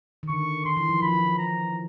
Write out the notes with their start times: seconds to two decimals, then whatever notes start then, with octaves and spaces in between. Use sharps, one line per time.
0.23 D#3
0.29 D3 C#6
0.65 D#3 C6
0.77 E3
0.89 F3
1.02 F3 B5
1.14 F3
1.39 A#5